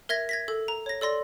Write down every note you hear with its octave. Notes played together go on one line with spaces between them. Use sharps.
A#4 E5 G#6 A#6
G#6 A#6 B6
A4
A#5
C#5 A#6
A4 D5 C6 A#6